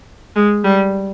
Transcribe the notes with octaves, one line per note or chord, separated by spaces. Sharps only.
G#3
G3